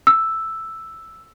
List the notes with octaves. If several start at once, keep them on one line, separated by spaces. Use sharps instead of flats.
E6